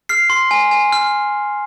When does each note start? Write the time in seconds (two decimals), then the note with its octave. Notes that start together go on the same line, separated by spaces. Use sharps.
0.09 F6 C7
0.30 C6
0.51 G#5
0.71 G#5
0.92 F6